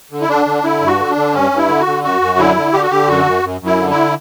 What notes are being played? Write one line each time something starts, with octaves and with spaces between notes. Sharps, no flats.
D3
E4
D3 D4
D3
D3 E4
G2
F#4
D3
D4
D3
G2 C#4
G2
E4
D3
F#4
D3
F#2 F#4
F#2
D3 E4
D3
D3 G4
F#4
D3 G4
F#2 F#4
F#2
F#2
F#2
E4
D3
E4